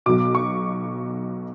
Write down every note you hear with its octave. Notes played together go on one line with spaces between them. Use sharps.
B1 B2 D6
C#6